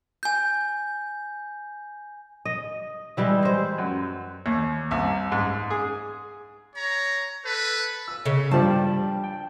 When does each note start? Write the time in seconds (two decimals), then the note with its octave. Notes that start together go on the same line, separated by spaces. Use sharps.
0.23 G#5 G6
2.45 D#5
3.17 E3 G3 G#3 E4
3.43 G#3 C5
3.78 F#2
4.46 D#2
4.91 C2
5.32 G#2
5.70 G#4
6.75 C#5 A#5
7.46 A4 B4
8.08 E6
8.26 C#3
8.51 G2 F3 G3 A5
9.24 G5